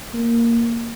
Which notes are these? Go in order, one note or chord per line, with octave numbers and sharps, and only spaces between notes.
A#3